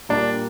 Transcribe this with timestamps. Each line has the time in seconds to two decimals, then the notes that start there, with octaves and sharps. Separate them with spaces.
0.09 A#2 G3 A#3 D4